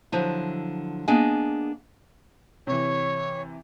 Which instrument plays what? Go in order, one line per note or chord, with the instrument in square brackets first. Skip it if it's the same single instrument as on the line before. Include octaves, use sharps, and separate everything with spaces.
[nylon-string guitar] D3 F3 F#3 E4
A#3 B3 D4 G#4 D#5 G#5
[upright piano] C3 E3 [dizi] C#5